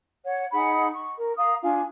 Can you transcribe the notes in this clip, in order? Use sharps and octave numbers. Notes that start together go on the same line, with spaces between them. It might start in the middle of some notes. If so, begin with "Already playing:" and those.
C#5 F#5
D#4 G#4 F#5 B5
C#6
A#4
F5 A#5 D#6
D4 F4 F5 G#5